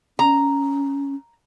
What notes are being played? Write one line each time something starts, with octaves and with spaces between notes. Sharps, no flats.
C#4 A#5